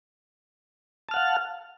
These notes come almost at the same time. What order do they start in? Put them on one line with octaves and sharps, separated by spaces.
A5 F6 F#5 F5